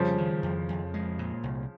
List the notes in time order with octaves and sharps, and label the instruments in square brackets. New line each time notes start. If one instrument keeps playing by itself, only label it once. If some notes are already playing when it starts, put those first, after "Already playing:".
Already playing: [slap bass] F2 G3 [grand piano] C#3 F3
[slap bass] D#3
F2
F2
G#3
A#2
C2